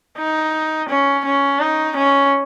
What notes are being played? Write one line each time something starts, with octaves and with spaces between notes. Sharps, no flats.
D#4
C#4
C#4
D#4
C#4